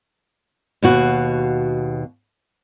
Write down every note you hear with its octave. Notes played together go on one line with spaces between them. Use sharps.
D#2 B2 F#4